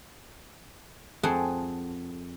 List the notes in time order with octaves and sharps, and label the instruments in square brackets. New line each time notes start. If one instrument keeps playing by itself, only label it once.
[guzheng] F2 C4 G#4 A4 F#5